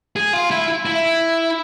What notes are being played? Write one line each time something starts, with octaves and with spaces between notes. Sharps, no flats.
G#4
F4
E4
E4